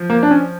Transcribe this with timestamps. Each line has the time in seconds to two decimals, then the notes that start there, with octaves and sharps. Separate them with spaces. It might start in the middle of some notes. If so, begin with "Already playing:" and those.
Already playing: F3
0.10 A#3
0.23 D4
0.31 C#4